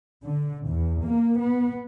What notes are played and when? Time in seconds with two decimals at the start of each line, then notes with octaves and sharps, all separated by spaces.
0.24 D3
0.67 E2
1.02 A#3
1.39 B3